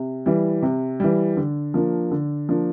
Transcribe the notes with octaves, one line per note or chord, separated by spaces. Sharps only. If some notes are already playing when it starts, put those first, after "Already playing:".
Already playing: C3
E3 G3
C3
E3 G3
D3
F3 A#3 D4
D3
F3 A#3 D4